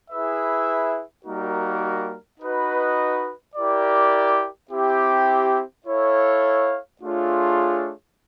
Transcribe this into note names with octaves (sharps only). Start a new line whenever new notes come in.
E4 G#4 B4 E5
G3 A#3 D#4 F#4 A#4
D#4 F#4 B4 D#5
E4 G4 A#4 D5
C4 E4 G4
E4 A4 C#5 F5
A3 D4 F4 G#4 C#5